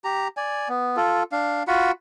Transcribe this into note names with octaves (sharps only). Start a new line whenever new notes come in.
G4 A#5
D5 G#5
B3
F4 A4
D4 F5
F4 F#4 F#5 B5